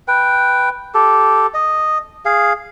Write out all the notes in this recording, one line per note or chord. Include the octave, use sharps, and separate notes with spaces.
B4 G5
G4 A4
D#5
G#4 F5